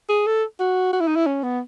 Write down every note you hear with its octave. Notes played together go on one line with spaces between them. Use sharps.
G#4
A4
F#4
F#4
E4
D#4
E4
C#4
B3